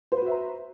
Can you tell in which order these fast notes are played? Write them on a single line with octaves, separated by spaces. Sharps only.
C5 B4 F#4 E5 A#5